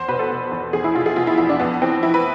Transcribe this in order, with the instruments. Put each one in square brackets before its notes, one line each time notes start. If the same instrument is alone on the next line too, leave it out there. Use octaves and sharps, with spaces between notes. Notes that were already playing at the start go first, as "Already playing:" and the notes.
Already playing: [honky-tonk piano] E2 C5
B2 B4
A4
B2
E2
E2 G#4
E4
B2 F4
G#4
B2 F4
E4
E2 E4
D4
F2 B3
E3 C4
E3 E4
B4